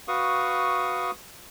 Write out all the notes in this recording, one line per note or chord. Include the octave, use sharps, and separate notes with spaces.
F#4 B4 F5 C#6 D#6